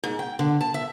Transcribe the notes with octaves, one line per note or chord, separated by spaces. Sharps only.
G#2
G5
D3
A5
E5